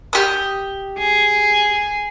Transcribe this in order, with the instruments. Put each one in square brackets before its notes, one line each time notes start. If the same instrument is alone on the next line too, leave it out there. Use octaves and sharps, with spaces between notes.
[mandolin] G4 D#6
[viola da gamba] G#4